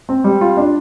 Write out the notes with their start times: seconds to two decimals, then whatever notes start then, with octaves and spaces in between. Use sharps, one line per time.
0.09 C4
0.24 G3
0.41 F4
0.57 D4